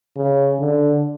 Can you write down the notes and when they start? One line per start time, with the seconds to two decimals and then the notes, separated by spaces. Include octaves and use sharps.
0.16 C#3
0.59 D3